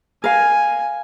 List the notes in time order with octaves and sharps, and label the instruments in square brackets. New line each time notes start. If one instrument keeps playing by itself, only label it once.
[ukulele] A#4 F5 [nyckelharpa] G#5